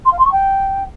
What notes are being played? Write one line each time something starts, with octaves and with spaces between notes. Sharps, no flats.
C6
F5
C6
C#6
G5